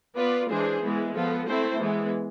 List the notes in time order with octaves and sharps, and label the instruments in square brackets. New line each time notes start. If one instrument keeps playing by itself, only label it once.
[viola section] B3 F4 B4 D5
E3 G#3 D4 G#4 C5
E3 G#3 B3
F3 B3 F4 A4
A3 C4 E4 A4 C5
E3 G#3 B3